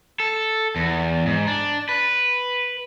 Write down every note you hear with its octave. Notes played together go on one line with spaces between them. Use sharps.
A4
E2
G#2
D4
B4